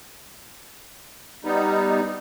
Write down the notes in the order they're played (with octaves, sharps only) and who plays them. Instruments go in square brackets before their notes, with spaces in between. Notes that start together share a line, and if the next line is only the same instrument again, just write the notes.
[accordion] G3 B3 D#4